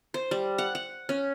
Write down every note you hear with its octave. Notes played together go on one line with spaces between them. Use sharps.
C5
G3
F#5
F#5
C#4